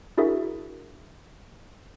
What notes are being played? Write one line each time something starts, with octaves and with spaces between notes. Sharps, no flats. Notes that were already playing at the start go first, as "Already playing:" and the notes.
D4 E4 F#4 G#4 A#4 E5